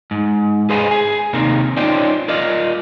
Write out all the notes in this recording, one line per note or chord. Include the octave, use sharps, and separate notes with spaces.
G#2
G#4 B4 C5 D#5 F5 G#5
G#4
D#2 C3 D#3 A#3
C#4 D#4 F4 C5 D5 G5
F4 A#4 D5 D#5 F5